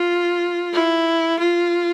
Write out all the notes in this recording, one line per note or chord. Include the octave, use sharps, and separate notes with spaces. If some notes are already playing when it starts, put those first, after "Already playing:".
Already playing: F4
E4
F4